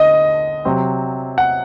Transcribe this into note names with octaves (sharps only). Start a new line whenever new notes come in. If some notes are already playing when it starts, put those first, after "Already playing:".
Already playing: D3 D#5
C3 F#3 C4
F#5